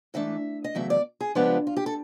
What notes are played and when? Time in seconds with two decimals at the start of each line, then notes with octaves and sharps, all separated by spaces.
0.14 G#2 E3 A3 D4 E5
0.64 D#5
0.75 E2 C#3 F#3 A3 E5
0.90 D5
1.21 G#4
1.35 C#3 F3 G#3 B3 D4 G4
1.67 F4
1.77 G4
1.86 A4